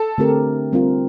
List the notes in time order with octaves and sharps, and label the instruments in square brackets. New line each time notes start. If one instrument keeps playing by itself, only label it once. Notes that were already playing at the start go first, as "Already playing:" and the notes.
Already playing: [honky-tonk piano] A4
[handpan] D3 A3 C4 G4 A#4
G3 C4 F4 A#4